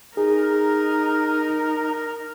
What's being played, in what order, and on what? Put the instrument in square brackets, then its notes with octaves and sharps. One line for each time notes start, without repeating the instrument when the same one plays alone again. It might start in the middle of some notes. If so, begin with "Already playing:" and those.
[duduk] D#4 [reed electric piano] G#4 [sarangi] A#4